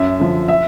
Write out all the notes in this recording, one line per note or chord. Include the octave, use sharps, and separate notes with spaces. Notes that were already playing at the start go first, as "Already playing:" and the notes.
Already playing: F#2 E5
D3 F3
E5